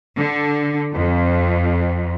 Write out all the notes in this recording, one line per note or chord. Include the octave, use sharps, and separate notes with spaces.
D3
F2